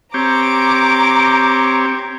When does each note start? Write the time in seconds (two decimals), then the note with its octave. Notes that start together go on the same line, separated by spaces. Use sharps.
0.14 C4 G4 C#5 A#5 D6